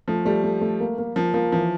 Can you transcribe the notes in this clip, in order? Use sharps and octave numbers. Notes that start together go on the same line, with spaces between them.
F3 A3
G3 A3
A3
A3
A#3
A#3
F3 A#3
F3 A#3
E3 F3